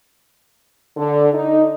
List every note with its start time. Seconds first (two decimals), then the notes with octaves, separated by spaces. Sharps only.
0.97 D3
1.33 D#4